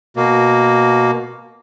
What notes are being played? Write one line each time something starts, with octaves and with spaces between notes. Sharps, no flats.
B2 A#3